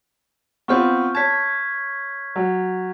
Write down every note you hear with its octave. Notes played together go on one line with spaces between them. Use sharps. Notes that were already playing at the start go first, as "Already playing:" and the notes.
B3 C4 F4 C#6 F6 G6
C#5 A5 G#6 B6
F#3